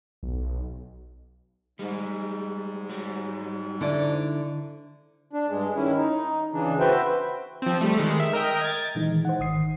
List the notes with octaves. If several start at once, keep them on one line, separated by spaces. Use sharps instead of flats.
B1
G#2 G3 G#3
F#3 G3
D3 E4 D5
D4
G2 G#3
D#3 C#4 E4
D#4
C#3 E3 D4
F#4 B4 C5 E5 G5
F3 C4
G3 A3
D#3 G#3
E5
A#4 D#5 G5
G#6 A6
A#2 D#3 E3 G#3 D#4
C5 F#5
G#1 D#3 D#6 C7